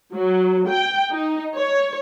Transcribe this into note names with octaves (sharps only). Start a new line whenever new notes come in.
F#3
G5
D#4
C#5